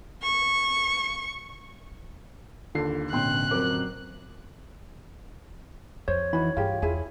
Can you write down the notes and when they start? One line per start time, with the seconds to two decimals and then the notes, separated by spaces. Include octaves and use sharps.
0.22 C#6
2.75 D#2 D3 F4 A4 C7
3.13 B1 A2 D3 C#4 G5 C6 F#6
3.51 F2 F#3 A#4 C5 D6
6.08 F2 C5 C#5
6.33 E3 D#4 F#4 B5
6.57 G2 F4 G4 G#4
6.82 E2 E4 G#4 G#5